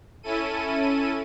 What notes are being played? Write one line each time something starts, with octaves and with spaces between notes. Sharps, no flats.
C#4 E4 A4 D#7